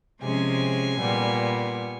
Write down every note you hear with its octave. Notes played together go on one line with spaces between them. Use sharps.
C3 F3 G#3 C#4 G#5
A#2 G3 B3